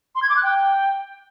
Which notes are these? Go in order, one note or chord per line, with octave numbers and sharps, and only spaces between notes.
C6
G#6
D6
F#6
G5